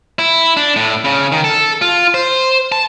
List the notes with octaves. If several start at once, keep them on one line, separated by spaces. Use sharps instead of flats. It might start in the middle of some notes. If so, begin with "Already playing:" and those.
E4
D4
A2
C#3
D#3
A4
F4
C5
A5